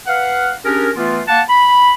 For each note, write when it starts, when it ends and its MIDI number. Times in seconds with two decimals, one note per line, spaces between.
0.07 0.50 71
0.07 0.50 77
0.07 0.50 78
0.64 0.89 61
0.64 0.89 62
0.64 0.89 67
0.64 0.89 68
0.64 0.89 70
0.96 1.20 52
0.96 1.20 57
0.96 1.20 59
0.96 1.20 65
1.27 1.40 58
1.27 1.40 78
1.27 1.40 81
1.48 1.91 83